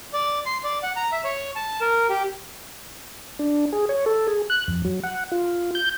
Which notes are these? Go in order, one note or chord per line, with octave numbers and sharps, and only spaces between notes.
D5
C6
D5
F#5
A#5
E5
C#5
A5
A#4
G4
D4
G#4
C#5
A4
G#4
F#6
F2
F#3
F#5
F4
G6